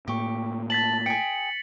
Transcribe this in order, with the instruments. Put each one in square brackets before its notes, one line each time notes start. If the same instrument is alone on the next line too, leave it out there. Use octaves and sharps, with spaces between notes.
[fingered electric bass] A2 A#3 [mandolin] G4 C#6
[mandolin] A5 [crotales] A6 B6 F#7
[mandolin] G#4 G5 [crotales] C#7